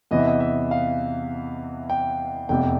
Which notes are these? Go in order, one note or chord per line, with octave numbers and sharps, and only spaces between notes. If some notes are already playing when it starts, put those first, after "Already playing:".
E2 C3 E3 D#5
E5
D#5
E5
F5
G5
F1 E2 C3 G5